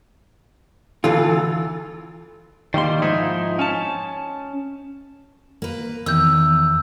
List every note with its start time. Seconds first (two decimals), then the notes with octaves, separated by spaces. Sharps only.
1.04 D2 E3 F4 A4
2.74 D#3 G3 A#3 C6
3.02 G#2 F3 D#4 E4
3.59 C#4 A5
5.62 A#3 B4
6.06 E2 D#3 E6 G6